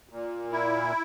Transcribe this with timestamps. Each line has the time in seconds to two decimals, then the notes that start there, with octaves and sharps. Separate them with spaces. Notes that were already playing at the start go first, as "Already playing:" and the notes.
0.09 A#2
0.52 E4